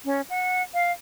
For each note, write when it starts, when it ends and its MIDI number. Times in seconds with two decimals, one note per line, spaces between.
0.05 0.22 61
0.30 0.62 78
0.74 0.92 77